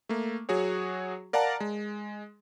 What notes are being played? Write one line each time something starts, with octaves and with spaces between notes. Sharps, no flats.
A3 A#3
F#3 F#4 G#4 C#5
A#4 D5 F5 F#5 A5 A#5
G#3